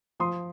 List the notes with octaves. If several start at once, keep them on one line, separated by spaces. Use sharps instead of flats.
F3 C6 D#6